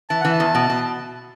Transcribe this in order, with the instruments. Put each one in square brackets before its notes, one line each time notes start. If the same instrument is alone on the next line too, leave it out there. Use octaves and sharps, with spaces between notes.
[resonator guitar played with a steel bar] E3 [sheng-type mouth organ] A5
[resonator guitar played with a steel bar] E3 [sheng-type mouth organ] F#5
[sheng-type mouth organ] A5
[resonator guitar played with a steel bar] E2
B2
B2